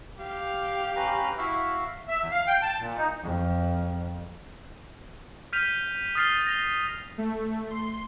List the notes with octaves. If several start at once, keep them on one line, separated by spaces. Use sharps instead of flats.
G4 F5
C#4 B4 A#5
E4 F#4 E5 F5
E5
E2
F5
G5
A5
A#2
D#4
F2
F6 G6 B6 D#7 F7
D#6 F6 A6 C7 D#7 G7
A#6 F7
A3
C6